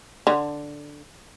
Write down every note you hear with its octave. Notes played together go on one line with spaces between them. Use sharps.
D3